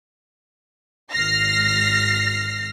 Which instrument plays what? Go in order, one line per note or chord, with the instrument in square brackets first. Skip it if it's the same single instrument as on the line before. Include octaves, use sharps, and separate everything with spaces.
[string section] G#1 F6 A#6 C7